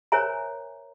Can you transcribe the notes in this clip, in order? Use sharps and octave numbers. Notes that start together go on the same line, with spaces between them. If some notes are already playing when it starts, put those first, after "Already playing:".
A#4 C5 C#5 E5 G#5 A#5